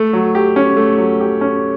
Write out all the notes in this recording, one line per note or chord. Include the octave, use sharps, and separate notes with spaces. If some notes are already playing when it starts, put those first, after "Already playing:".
Already playing: A3
F#3
G4
C#4
A3
F#3
G4
C#4